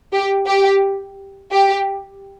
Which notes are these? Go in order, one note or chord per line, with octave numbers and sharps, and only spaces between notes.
G4
G4
G4